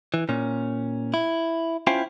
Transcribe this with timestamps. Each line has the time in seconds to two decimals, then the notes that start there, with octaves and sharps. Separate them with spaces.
0.14 E3
0.29 A#2 C#4
1.14 E4
1.87 C#4 E4 F4 C5 F5 G5